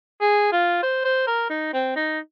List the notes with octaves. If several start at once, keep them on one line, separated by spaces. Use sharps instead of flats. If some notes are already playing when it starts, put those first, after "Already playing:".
G#4
F4
C5
C5
A#4
D#4
C4
D#4